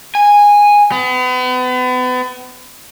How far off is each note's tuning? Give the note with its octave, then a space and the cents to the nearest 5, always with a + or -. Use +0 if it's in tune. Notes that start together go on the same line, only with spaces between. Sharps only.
G#5 -10
B3 +35